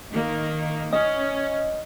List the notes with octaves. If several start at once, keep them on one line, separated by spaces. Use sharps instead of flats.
D#3 A#3
C#4 D#5